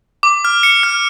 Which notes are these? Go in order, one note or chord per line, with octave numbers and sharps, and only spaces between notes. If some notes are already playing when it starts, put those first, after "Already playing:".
D6
F6
C#7
F6